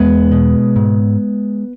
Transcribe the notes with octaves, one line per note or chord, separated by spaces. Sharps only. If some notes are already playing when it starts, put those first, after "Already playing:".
Already playing: E2 G#3 B3
B2
G#2